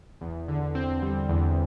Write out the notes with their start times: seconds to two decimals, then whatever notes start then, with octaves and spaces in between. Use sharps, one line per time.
0.21 E2
0.48 D3
0.75 C4
1.02 G3
1.29 E2